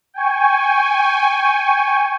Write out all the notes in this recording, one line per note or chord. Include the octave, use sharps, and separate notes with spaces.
G5 G#5 C#6